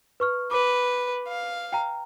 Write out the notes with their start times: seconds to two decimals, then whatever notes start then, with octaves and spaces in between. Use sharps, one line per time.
0.20 B4 C#6 F6
0.51 B4 D6
1.28 F5
1.73 G5 A#5